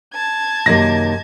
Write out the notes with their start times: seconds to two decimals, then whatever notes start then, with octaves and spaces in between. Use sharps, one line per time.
0.14 A5 G#6
0.66 F#2 C3 D#3 A#3 C#5 D#5 A#6